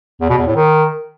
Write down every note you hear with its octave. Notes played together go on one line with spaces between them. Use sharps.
E2
B2
E2
A2
D#3